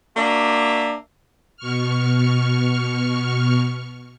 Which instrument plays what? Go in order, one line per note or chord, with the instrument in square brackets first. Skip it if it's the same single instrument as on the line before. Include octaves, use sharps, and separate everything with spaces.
[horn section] A#3 D4 F#4 D5 E5
[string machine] B2 C#6 F6